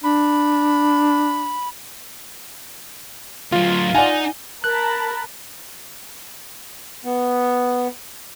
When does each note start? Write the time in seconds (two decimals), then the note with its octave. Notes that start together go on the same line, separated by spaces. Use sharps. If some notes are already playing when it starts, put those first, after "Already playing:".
0.04 D4 B5
3.52 D2 F#3 F4
3.95 D#4 D5 F#5 G#5
4.64 A#4 A5 B5 F#6
7.05 B3